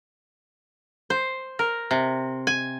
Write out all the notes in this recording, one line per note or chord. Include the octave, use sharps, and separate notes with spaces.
C5
A#4
C3
G#5